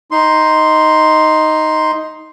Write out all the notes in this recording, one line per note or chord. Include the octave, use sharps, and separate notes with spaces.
D#4 C6